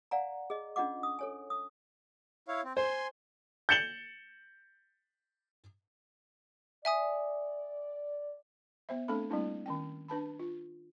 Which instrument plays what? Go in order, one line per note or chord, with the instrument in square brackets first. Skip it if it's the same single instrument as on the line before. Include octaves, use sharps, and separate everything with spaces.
[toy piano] D5 F5 F#5 G#5 A#5
G#4 D#5
C#4 D4 F4 D#5 F#5 D6
D#6
A4 C#5 G#5
D#6
[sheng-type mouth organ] E4 C#5 F5
C4
[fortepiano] C5 [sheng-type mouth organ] G#5 C6
[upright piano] G6 A6 C#7 E7 F#7 G7
[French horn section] D5 [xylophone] E5 G#5 D#6
[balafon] B3 C5 E5
A3 C4 D4 A4 B5
G3 A3 A#3 C4 D4 E4
D#3 C#4 G5
D4 B4 A5 B5
F4